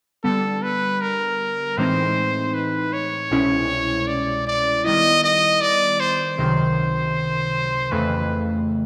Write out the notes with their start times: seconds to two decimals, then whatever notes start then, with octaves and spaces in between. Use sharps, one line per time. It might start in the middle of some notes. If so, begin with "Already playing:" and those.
0.24 D3 G3 B3 A4
0.62 B4
1.01 A#4
1.77 A2 E3 G#3 C4 D#4 C5
2.54 B4
2.93 C#5
3.31 C2 B2 G#3 C#4 E4
4.07 D5
4.47 D5
4.84 D#3 G3 B3 E4 D#5
5.24 D#5
5.61 D5
6.00 C5
6.38 C#2 C3 D#3 F#3
7.91 F2 C#3 E3 A3 B4